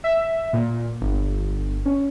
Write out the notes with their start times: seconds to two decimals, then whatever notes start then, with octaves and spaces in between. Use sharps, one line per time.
0.04 E5
0.53 A#2
1.01 G1
1.86 C#4